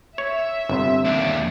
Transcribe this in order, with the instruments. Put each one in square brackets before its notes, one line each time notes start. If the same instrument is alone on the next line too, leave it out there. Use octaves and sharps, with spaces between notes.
[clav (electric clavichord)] C#5 [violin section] E5
[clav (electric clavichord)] G1 [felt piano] C3 C6
[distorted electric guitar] D#2 D4